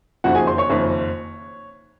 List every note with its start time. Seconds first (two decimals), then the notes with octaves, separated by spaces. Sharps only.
0.24 F#1 F2 D#3 F#4 F#5
0.35 G#4 G#5
0.47 C5 C6
0.58 C#5 C#6
0.70 F#1 F2 D#3